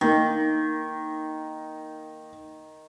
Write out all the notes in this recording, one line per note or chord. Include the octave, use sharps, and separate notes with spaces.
D#3 A#3 D#4